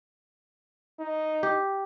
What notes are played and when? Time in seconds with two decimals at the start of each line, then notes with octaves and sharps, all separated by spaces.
1.00 D#4
1.43 G4